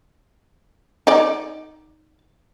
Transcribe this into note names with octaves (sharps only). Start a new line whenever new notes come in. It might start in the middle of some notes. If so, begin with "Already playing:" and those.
D#4 D5